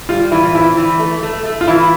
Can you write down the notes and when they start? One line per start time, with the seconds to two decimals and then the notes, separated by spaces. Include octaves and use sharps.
0.09 G3 F4
0.32 E3 E4
0.43 F4
0.55 C4 E4
0.77 E3
0.99 A3
1.23 A3
1.45 A3
1.61 F4
1.67 E3 E4